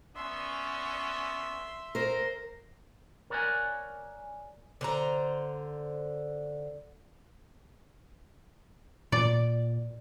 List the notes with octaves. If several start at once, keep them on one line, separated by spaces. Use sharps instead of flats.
B3 C#4 D5 E5 C6
A#4 C5
A#4 C#5 D5 F5 F#5 G#5
D3 C5 A#5
A#2 D5